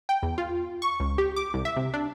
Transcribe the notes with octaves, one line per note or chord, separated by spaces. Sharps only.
G5
E2
F4
C#6
C#2
G4
D6
C2
E5
C3
D4